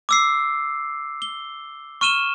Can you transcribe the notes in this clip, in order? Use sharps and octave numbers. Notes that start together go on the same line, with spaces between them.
D6 E6 C7
G7
C#6 F6 D#7 E7 G7